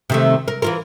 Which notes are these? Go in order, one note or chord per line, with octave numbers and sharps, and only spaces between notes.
C3 D#3 A3
A#4
E3 F4 A#4